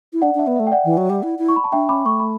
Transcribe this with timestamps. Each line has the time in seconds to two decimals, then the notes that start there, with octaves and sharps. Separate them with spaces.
0.13 E4
0.22 D4 D5 F#5
0.35 D4 E5
0.47 B3
0.56 A3 E5
0.67 G5
0.72 D5 F#5
0.85 E3
0.97 F#3
1.10 G3
1.23 E4
1.39 E4
1.49 C#6
1.56 B5
1.64 A5
1.72 D4 E5 G5
1.89 C#4 B5 D6
2.06 A3 C#6
2.20 B5